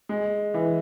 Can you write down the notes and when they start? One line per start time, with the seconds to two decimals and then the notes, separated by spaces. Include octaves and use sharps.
0.09 G#3
0.54 E3